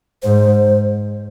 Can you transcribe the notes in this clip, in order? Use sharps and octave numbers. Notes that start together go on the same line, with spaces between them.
G#2 C5